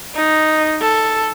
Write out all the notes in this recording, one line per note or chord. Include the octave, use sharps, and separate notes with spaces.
D#4
A4